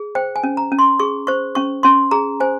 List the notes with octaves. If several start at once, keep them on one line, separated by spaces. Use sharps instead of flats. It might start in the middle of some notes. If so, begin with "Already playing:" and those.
Already playing: G#4
C5 G5
G#5
C#4
A#5
C#4
C6
G#4 C#6
C5 C#6
C#4 C#6
C#4 C6
G#4 A#5
C5 G#5